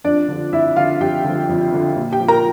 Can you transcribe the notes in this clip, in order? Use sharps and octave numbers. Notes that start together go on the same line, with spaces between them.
F2 D4 D5
D3 F3
F2 E4 E5
D3 F3 F4 F5
F2 G4 G5
D3 F3
F2
D3 F3
A#2
G4 G5
F3
A#4 A#5